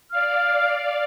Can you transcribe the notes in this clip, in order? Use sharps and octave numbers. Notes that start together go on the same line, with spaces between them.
D5 F5 F6